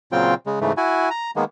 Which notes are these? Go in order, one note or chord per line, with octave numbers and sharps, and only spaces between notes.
A#2 C#3 F#3 C4 F4 G5
C#3 G#3
G#2 C#3 E3 A3
E4 F#4 G#5
A#5
D#3 G#3 A#3 B3